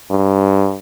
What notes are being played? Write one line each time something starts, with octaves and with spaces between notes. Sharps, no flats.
G2